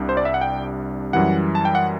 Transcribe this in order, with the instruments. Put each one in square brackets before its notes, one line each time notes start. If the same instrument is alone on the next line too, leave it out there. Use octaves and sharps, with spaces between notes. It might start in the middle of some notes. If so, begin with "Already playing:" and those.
Already playing: [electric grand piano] C2 C3 G3 D4
C5
D5
E5
F#5
G5
F#2 E3 G3 F#5
A5
G5
F#5